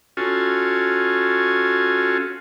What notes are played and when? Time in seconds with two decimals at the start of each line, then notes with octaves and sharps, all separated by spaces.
0.17 C#4 F4 F#4 A4 G#5